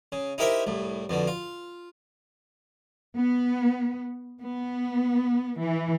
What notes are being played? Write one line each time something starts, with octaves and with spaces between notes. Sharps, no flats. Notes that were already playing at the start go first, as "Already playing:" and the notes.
C#3
D#4 E4 G4 A#4 C5 E5
C2 A2
F2 B2 D3
F4
B3
B3
E3